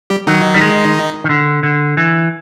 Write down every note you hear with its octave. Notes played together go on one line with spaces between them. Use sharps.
G3 G4
D#3 F#3 D#4
G3
G#3
D#3
D3
D3
E3